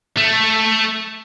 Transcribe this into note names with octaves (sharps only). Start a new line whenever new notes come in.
A3